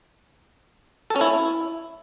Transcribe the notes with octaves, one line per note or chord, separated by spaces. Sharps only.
A4
C#4
E4